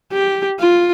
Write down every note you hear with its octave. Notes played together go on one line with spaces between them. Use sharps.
G4
F4